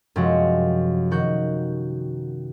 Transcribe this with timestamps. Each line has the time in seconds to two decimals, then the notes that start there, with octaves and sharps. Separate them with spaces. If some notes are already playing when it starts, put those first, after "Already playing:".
0.16 F#2 C3 F3 G#3 F#4
1.11 D#3 F#4 G6